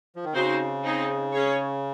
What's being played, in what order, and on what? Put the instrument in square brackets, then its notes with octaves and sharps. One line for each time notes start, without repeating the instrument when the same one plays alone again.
[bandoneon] F3
D#3
[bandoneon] C#3 [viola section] C4 D#4 F#4 C5
[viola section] C4 D#4 G#4
C#4 G#4 C#5